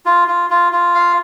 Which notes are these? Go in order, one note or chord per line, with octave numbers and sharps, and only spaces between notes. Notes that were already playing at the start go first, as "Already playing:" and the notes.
F4
F4
F4
F4
F5